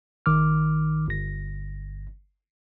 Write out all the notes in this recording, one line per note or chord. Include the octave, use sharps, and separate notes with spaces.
A#1 D#3 D6 F6
G1 A#6